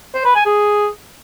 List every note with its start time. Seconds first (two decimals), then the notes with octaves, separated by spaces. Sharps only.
0.15 C5
0.25 B4
0.35 G#5
0.46 G#4